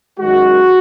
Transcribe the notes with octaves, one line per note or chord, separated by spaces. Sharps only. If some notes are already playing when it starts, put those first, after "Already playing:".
F#2 D#3 G#3 F#4